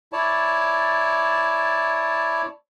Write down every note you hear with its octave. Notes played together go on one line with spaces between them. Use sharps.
E4 C#5 D5 A5